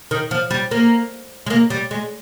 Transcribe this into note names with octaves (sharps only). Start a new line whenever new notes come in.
D#3
F3
G3
A#3
G#3
A#3
G3
G#3